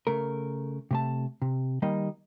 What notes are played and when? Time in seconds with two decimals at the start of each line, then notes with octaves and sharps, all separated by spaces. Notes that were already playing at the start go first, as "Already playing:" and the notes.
0.07 C#3 A3 A#4
0.91 C3 A3 A5
1.42 C3
1.82 D#3 G3 A#3 D#4 D#5